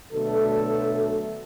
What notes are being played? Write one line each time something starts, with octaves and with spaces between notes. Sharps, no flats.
B2 D3 F#3 A3 A4